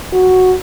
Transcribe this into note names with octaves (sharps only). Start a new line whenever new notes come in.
F#4